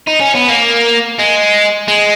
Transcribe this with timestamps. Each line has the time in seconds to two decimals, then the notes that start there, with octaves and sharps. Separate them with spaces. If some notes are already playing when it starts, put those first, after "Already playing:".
0.08 D#4
0.21 C#4
0.35 B3
0.49 A#3
1.19 G#3
1.88 G#3